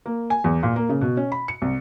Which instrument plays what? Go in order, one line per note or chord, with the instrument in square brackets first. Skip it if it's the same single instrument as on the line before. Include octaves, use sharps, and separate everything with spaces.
[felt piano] A#3
G#5
E2
A#2
A#3
C#3
B2
C#4
B5
C#7
C2